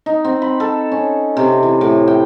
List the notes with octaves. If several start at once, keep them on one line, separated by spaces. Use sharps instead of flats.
D#4
C4
B5
A4
C#4
C3
E3
A2
G5